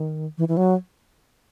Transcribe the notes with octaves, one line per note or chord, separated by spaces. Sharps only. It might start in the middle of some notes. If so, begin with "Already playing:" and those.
Already playing: D#3
E3
E3
F#3